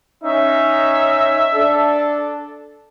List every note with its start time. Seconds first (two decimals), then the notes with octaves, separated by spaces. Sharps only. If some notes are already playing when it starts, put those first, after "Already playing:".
0.24 C#4 D#4 E5
1.54 D4 A4